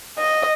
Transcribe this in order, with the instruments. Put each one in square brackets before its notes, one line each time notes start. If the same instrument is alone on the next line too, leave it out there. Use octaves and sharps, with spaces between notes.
[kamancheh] D#5